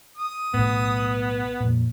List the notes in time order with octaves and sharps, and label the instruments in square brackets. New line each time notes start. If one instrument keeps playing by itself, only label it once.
[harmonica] D#6
[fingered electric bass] B1 A2 [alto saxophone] B3
[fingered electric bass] F2 A#2